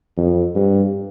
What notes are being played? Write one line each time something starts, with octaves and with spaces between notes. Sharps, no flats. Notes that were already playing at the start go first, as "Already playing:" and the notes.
F2
G2